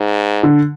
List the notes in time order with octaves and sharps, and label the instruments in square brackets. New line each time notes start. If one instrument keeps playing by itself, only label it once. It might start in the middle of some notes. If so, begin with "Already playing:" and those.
Already playing: [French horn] G#2
[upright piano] D3